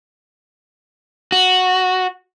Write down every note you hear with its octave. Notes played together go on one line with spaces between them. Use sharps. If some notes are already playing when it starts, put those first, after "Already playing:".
F#4